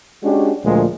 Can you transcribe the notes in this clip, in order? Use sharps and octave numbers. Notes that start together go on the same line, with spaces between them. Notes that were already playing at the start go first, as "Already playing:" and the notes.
G#3 C#4 D4 F#4 G4
D2 A#2 F3 G#3 A3